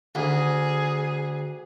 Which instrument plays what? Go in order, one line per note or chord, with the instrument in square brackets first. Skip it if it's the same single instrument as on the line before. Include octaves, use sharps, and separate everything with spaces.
[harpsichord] D2 [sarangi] G#4